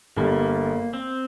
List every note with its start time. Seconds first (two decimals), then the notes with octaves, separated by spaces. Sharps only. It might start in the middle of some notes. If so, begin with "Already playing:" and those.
0.17 G1 G2 G3 A#3
0.93 C4